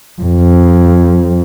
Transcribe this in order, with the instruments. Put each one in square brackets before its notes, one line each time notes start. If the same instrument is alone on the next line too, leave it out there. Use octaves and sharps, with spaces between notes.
[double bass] F2